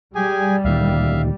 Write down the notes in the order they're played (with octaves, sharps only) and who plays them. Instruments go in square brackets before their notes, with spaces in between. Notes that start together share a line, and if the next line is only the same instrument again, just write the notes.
[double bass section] G3 [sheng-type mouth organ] G4 G#4 G#5
[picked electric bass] D2 A#2 D#3 [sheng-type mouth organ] E5 F5